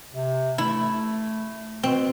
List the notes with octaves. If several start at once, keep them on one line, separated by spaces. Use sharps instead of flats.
C3
A3 E4
B2 C4